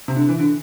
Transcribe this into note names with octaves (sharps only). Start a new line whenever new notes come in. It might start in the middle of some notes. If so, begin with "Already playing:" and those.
C3
D3
E3
D3